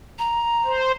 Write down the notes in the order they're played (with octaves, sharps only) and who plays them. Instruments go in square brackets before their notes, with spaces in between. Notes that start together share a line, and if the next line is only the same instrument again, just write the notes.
[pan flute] A#5
[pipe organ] C5